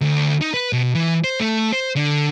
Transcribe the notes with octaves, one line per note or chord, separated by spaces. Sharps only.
D2
D#4
B4
B2
E3
C5
A3
C5
D3